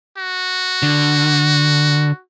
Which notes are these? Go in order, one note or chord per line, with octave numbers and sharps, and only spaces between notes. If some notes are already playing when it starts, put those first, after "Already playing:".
F#4
D3